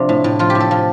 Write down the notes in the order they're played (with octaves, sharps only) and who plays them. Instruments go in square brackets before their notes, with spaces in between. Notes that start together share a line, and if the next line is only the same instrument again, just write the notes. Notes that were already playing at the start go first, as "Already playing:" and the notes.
Already playing: [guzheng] C3 F3 C4 D4
A2
A2
F3 F4
G4
A2
A4
F3